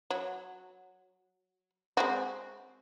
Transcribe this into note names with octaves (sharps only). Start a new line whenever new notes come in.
F#3
G#3 C4 F#4